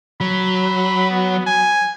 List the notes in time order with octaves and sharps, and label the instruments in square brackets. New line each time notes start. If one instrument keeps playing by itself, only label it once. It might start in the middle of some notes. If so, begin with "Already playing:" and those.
[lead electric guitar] F#3 [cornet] B5
[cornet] B3
G#5